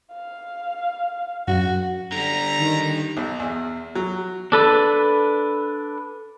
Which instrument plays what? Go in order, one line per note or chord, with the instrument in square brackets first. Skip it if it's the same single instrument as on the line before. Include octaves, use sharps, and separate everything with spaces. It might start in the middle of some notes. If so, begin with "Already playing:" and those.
[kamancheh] F5
[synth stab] F#2 [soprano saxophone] F#4
[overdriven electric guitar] D3 G3 [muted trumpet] A#5
[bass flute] D#3
[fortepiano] B1
E2
F#3
[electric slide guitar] D4 A4 B4